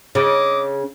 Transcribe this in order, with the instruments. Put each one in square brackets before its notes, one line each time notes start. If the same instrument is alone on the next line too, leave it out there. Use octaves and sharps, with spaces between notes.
[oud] C#3 [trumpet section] D#5 D6